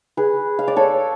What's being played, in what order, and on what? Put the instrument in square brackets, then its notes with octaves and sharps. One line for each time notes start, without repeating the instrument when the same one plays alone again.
[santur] G#4 B4
F5
D5
A4 C#5